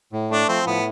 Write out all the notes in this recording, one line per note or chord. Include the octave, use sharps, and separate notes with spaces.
A2
A3 D4
F3 C4
A2 B3